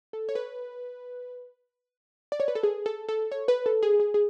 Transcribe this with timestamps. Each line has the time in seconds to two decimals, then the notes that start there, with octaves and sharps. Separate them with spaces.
0.13 A4
0.29 C#5
0.35 B4
2.32 D5
2.40 C#5
2.48 B4
2.55 A4
2.63 G#4
2.86 A4
3.09 A4
3.32 C#5
3.48 B4
3.66 A4
3.83 G#4
4.00 G#4
4.14 G#4